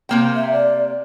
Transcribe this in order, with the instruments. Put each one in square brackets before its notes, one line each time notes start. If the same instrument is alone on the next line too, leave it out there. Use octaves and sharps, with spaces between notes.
[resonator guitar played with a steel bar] C3 A#3 G5
[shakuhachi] E5
D5